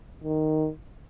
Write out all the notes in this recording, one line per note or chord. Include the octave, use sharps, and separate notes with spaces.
D#3